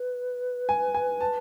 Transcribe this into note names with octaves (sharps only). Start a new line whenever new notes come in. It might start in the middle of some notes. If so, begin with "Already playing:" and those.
Already playing: B4
G#5
G#5
A5